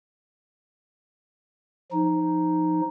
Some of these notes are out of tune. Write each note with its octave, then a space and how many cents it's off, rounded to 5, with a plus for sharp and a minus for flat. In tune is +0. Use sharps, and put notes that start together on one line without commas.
F3 +0 D#4 +0